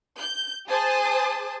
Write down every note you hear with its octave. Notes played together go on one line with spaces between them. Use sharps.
G6
G#4 C5 G#5 A5 D#6